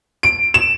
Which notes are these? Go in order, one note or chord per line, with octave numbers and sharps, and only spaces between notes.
D7
E7